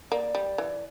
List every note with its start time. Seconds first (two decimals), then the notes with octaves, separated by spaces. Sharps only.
0.11 A#3 D5
0.35 G3
0.58 E3